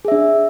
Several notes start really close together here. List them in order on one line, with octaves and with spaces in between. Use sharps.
G#4 E5 D4